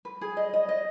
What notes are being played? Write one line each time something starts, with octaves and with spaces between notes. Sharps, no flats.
B4
G#4
D#5
D#5
D#5